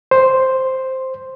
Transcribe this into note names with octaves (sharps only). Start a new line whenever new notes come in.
C5